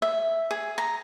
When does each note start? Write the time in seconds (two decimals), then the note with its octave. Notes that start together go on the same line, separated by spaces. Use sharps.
0.02 E5
0.51 G#4
0.78 A#5